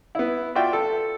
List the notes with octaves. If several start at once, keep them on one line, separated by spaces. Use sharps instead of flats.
B3 E4
F4 F#4 D5 E5 G5
A4